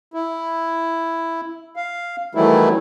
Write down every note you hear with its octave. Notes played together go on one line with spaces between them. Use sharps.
E4
F5
D#3 E3 F#3 G3 A3 E4